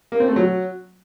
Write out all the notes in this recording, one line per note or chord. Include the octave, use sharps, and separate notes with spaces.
A#3
C4
A3
F#3